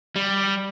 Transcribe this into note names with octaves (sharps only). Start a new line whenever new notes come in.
G3